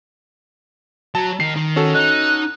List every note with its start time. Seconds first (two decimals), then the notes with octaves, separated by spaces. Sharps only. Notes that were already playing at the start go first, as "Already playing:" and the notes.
1.15 F#3 A5
1.40 D#3 C7
1.56 D#3
1.76 C#4 F#4 A4
1.94 D#4 F#6